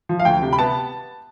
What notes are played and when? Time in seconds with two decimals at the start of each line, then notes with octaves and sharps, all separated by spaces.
0.09 F3
0.20 F5
0.25 D2 G5
0.42 C3
0.53 B5
0.58 B3 A5